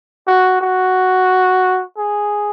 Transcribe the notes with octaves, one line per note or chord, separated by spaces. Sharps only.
F#4
F#4
G#4